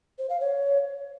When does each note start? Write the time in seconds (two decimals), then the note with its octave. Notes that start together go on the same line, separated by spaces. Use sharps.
0.19 C5
0.30 F5
0.41 C#5